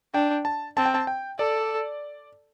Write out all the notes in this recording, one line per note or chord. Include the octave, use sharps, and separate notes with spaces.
D4 G5
A5
C4 A5
G5
A5
G5
A4 D5